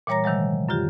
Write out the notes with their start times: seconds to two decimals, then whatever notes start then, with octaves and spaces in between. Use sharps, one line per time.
0.07 A#2 E3 G3 C#5 A#5 A#6
0.24 C3 D#3 E3 F#3 G#3
0.69 F#2 D3 F4 G4